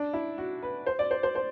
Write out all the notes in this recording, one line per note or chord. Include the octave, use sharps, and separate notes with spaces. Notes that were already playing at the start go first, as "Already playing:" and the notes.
Already playing: D4
E4
F#4
B4
C5
D5
C5
C5
C5